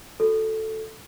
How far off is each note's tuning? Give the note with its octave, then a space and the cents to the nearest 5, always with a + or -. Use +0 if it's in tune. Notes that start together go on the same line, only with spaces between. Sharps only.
F#4 -20 A4 +0